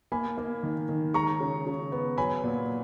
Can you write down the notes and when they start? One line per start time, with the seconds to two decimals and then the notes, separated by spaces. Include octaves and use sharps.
0.12 A#3 G#5 B5
0.38 A#3
0.63 D#3
0.89 D#3
1.14 G#3 A#5 C#6
1.40 C#3
1.67 C#3
1.92 B3
2.18 F#3 G#5 B5
2.44 A#2